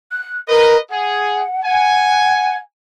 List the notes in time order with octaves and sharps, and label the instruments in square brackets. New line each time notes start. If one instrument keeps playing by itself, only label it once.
[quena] F#6
[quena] A#4 [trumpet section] B4 D#5
[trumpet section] G#4 [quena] F#5
[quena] F#5 [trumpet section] G#5